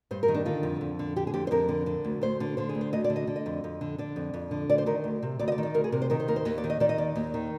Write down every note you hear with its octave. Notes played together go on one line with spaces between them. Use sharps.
G2 C5
A#4
D#3
D4
D3 F4
F2
F2
D3
D3 G4
G#4
F2 G4
C5
F2 A#4
D3
D3
D2
D2 C5
D3
D3 C5
G#4
D2
C5
D2 D#5
D5
D3
D#5
D3
D#5
F2
F2
D3
D3 D5
F2
F2
D3
D2 D5
C5
D#3 A#4
D2
C3
D2 D5
D#5
D5
D#3
D5
D2 A#4
G#4
C3 A#4
C5
D#3 A#4
C5
D#2 A#4
C5
D#2 D#5
D5
D#3
D#5
D#3 D5
D#5
D#2 D5
D#2
D#3